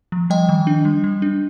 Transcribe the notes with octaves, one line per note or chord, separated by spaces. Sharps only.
F3
G3 D#5 G5
D#3
D4
G3
G3
D4